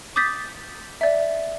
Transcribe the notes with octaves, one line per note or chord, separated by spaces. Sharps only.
D6 D#6 G6 A6 B6
D5 E5